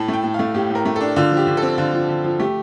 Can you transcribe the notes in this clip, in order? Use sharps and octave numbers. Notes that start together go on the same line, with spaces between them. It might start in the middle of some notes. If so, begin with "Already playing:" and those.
Already playing: A2 A5
A3 G5
A2
F5
A3
A2 G4
A2
A#4
A3
D4 A4
D3 F4
F3
G4
D3
C4 A4
D3 F4
F3
D3
F3
A3 G4